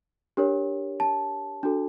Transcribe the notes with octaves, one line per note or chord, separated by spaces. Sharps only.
D4 G4 A#4 C#5
A5
D4 F#4 A4